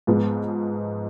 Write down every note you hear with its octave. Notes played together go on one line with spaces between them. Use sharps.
G#2 F3 G#3 B3